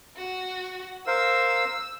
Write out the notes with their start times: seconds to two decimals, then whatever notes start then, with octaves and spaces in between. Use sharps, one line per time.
0.17 F#4
1.07 A#4 C5 F5 E6